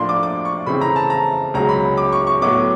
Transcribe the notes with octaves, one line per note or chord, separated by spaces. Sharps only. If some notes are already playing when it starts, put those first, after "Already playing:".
Already playing: A2 F3 A#3 D4 C6
D6
D6
C#6
C#3 E3 A3 C4 B5
A#5
A5
A#5
C#2 C#3 F#3 A#5
B5
D6
C#6
C#6
A2 F#3 B3 D6